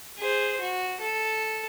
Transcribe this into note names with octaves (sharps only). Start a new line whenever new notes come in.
G#4 C5
F#4
A4